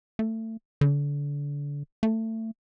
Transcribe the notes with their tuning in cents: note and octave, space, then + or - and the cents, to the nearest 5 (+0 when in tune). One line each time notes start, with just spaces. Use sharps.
A3 +25
D3 -30
A3 +25